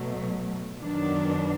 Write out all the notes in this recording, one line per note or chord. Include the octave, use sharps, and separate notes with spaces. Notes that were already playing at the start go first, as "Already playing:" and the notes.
Already playing: B2 F#3 A3
F#2 D#3 F#3 B3 D4